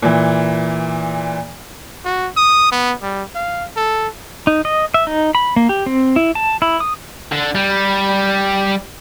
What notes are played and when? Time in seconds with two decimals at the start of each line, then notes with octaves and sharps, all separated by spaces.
0.02 A#2 E3
2.05 F#4
2.37 D#6
2.72 B3
3.02 G3
3.35 F5
3.77 A4
4.47 D#4
4.65 D#5
4.94 E5
5.07 D#4
5.35 B5
5.56 A#3
5.69 G4
5.86 C4
6.16 E4
6.35 A5
6.62 E4
6.80 D#6
7.32 D3
7.55 G3